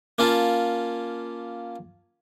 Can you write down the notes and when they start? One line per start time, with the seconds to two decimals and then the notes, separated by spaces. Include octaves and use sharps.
0.19 A#3 C#4 F4 A5